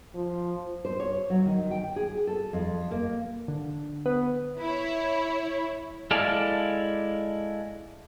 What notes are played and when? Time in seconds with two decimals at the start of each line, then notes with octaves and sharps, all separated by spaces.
0.15 F3
0.85 C5
1.00 C#5
1.30 F#3
1.46 D#3
1.71 G5
1.96 G#4
2.27 A4
2.53 F2
2.91 A#3
3.48 D3
4.06 B3
4.60 E4 C#5
6.11 G#3 E4 A4 D5 F5